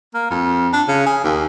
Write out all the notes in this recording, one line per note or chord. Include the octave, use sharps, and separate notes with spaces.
A#3
F2
D4
C#3
G#4
D#2